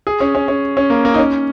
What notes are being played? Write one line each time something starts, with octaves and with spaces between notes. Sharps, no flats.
G#4
C#4
C#4
C#4
C#4
A#3
A#3
D#4
C#4